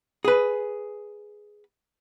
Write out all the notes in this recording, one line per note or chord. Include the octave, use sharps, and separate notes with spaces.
G#4 B4